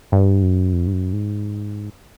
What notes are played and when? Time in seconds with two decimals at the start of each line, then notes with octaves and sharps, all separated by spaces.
0.12 G2
0.42 F#2
0.73 F2
0.87 G2
0.93 F#2
1.13 G#2